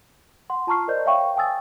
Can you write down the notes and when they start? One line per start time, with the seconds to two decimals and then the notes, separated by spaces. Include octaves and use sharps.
0.50 F#5 C6
0.67 F4 A5 A#5 C#6 F6 C7
0.88 A#4 C5 D5 D#5 G6
1.06 C#5 E5 F5 G5 C#6
1.37 G5 G#5 D#6 E6 A6